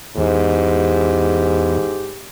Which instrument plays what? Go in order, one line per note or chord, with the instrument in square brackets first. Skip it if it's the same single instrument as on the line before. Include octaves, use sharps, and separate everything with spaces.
[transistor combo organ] E2 [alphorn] G#2 [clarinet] G4